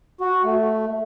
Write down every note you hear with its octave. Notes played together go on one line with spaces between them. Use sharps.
F#4
A3